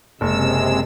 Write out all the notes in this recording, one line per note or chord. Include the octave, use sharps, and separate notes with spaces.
F#1 C3 G#3 E6